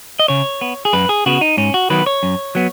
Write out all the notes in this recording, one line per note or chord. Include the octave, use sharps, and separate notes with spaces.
D#5
C#3 C#5
B3
G#4
F#2 B4
G#4
C#3 B3 F#4
D#4
G#2 C#4
F#4
D#3 F#3 B3 B4
C#5
F#2
F#3 B3